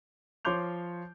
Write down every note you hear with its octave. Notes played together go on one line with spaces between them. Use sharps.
F3 C#5 C6 D6 G6 F7